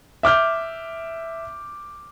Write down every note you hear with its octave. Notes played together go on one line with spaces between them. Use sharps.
E5 D6 F6 G6